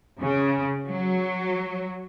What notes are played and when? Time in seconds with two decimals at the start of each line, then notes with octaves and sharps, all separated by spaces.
0.21 C#3
0.89 F#3